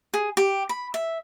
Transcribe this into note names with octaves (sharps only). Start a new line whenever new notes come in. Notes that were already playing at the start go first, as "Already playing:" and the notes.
G#4
G4
B5
E5